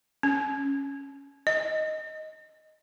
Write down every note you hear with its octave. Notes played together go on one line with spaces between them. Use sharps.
C#4
D#5